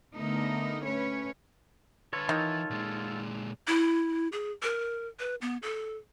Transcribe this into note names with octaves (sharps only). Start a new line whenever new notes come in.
D3 A3 B3 D#4 A#4
A3 C#4 B4 C#5
D3 F4 A4 B4 C#5
D#3 E3
A#2 G#3
E4
G#4
A#4
B4
B3
A4